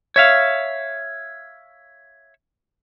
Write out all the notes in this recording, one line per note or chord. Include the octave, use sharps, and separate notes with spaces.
C#5 E5 F5